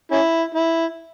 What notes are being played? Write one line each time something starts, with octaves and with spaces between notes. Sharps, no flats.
C#4 E4
E4